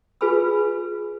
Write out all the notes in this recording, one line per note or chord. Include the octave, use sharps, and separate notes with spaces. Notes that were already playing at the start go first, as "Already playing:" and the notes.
F4 G#4 B4 G#5 B5 E6